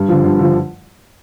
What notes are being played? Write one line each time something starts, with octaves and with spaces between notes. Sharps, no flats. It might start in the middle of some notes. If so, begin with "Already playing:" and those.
Already playing: G2
D3 F3
G2
D3 F3